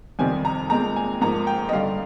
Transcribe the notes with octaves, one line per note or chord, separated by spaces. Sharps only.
F2 C3 D#3 G3 C4 G#5
A#5
A#2 G#3 C4 A#5
G#5
G#2 F3 A#3 A#5
G5
D#5
G2 D3 G3 F5